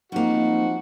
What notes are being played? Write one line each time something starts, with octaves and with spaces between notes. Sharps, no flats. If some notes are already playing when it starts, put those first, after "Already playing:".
F3 G3 A#3 C4 D#4 F#4